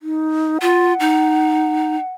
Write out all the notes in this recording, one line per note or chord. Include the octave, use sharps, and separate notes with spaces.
D#4
F4 F#5
D#4